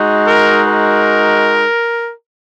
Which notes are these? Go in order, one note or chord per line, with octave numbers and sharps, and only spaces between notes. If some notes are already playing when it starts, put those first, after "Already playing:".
Already playing: G#3 D#4 F#4
A#4
A#4